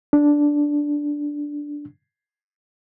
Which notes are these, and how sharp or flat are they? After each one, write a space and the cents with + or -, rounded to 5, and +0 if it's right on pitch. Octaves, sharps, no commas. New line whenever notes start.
D4 -5